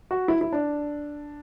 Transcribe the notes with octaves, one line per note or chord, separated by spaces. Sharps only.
F#4
E4
E4
D4